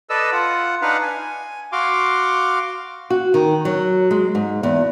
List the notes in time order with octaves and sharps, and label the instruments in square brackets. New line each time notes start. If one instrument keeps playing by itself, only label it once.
[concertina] A4 B4 D5 D#5 E6
F4 F#5
D4 D#4 B4 F5 F#5
G#5
F#4 F5 C6 D6
[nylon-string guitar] F#4
D#3
F#3
G#3
G#2
E2